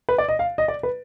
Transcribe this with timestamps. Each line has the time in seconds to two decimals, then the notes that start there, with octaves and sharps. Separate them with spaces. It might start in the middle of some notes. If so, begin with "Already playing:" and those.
0.09 B4
0.18 D5
0.28 D#5
0.39 F5
0.58 D#5
0.68 D5
0.83 B4